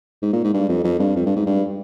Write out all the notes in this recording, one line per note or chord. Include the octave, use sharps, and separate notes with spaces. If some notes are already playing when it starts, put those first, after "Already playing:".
G#2
A#2
G#2
G2
F2
F2
G2
F2
G2
G#2
G2